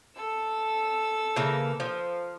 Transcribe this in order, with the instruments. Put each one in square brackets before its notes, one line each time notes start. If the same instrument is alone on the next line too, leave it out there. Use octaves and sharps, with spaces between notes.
[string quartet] A4 E6
[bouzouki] C#3 E3 A#3
F3